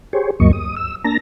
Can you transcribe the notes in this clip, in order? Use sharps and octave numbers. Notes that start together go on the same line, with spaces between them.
G4 G#4 C5 C#5
D2 G2 F#3 A#3 D#5 C#6
D#6
E6
A#3 D4 A5 A#5 A#6